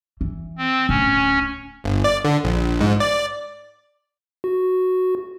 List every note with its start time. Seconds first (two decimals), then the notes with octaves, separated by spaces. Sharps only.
0.21 E3
0.58 C4
0.89 D1 C#4
1.84 G1
2.04 D5
2.25 D3
2.44 A#1
2.80 G#2
3.00 D5
4.44 F#4